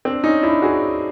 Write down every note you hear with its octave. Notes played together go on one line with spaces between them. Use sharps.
C4 D4
C#4 D#4
D4 E4
F#4 G#4